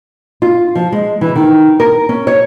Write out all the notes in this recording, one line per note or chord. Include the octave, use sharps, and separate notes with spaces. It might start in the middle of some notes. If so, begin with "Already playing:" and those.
F4
F3
G#3
E3
D#3
A#4
C#4
C#5